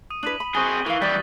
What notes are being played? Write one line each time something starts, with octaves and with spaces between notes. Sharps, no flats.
D#6 D#7
D4 E4 B4 B6 D#7 F#7
B5
C4 G#4 C#6 F#6 G7
E3 A#4 F5
E3 G3 D5 D#6 A6 B6